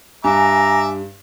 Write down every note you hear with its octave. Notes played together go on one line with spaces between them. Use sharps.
G2 E5 G#5 A#5 D6